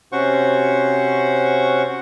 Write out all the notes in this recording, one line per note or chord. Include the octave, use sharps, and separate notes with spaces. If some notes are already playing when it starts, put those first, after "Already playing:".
C3 C#4 F#4 C5 F#5 C#6